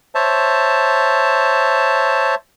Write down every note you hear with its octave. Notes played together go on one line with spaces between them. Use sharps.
C5 C#5 E5 A5